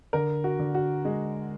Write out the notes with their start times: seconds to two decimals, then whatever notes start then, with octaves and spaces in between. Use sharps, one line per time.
0.13 D3 A#4
0.44 F#4
0.59 D3
0.75 F#4
1.05 G#3